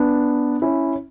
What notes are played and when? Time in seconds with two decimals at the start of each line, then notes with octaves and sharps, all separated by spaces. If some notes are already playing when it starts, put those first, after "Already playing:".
Already playing: B3 D4
0.62 C#4 E4